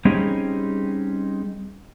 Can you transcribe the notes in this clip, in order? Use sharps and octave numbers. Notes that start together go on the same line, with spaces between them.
G3 C4 C#4 D#4 G4 G#4